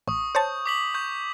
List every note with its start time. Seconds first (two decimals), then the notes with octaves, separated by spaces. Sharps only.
0.07 A1 C#6 D#6
0.35 C5 C#5 A5 G6
0.66 D6 B6 F#7
0.94 C#6 G6